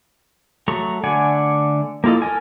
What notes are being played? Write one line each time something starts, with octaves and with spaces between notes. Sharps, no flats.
F#3 A3 A#5 C#6
D3 A3 D5 F#5 G#5
A#3 E4 F4 A4 D#5
A4 A#4 G#5